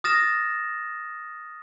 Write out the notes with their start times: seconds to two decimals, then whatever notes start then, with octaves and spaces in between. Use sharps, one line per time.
0.04 D#6 F6 A6 A#6 E7